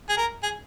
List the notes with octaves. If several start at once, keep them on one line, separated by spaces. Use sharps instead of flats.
G#4
A#4
G#4